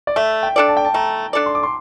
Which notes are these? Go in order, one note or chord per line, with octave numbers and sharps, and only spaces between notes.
D5
A3 E5
G5
D4 A4 D5
A5
G5
A5
A3 A#5
D4 A4 D5
C6
D6
C6